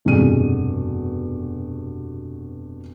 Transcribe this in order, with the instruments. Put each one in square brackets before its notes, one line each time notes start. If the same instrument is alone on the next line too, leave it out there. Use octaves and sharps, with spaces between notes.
[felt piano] F1 G2 B2 G#4 D#7